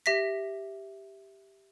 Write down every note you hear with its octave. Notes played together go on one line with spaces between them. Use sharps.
G4 E5 A#6 B6